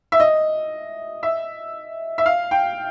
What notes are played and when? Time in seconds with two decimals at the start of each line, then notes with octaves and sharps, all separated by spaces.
0.12 E5
0.20 D#5
1.23 E5
2.18 E5
2.26 F5
2.51 G5